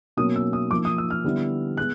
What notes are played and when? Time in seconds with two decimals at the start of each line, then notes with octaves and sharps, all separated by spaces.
0.17 B2 F#3 A#3 C#4 D#6
0.36 E6
0.53 D#6
0.71 F3 A#3 D#4 D6
0.85 D#6
0.98 E6
1.10 F6
1.24 D3 G3 B3 E4
1.77 G#3 B3 F#6